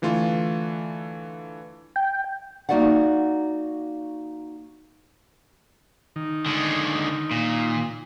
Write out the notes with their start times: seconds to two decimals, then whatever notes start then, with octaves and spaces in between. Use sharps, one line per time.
0.02 D3 E3 A3 F4
1.96 G5
2.69 A#3 D#4 F#4 D5 E5 F#5
6.16 D#3
6.46 D3 G#3
7.31 A#2